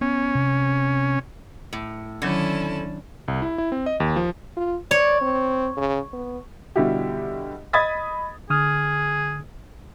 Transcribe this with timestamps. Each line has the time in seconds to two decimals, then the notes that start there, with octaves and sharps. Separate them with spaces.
0.01 B3 C#4
0.35 C3
1.73 A2
2.22 D3 D#3 F#3 C#4 E4 A5 G#6
3.28 C2
3.42 E4
3.58 E4
3.72 C4
3.86 D#5
4.00 D#2
4.16 F3
4.57 F4
4.91 C#5 D5
5.21 C4
5.77 C#3
6.13 B3
6.76 B2 D3 G3 E4 F#4 G4
7.73 D#5 B5 D#6 G#6 A6 B6
8.50 D3 G#4 D#6 F6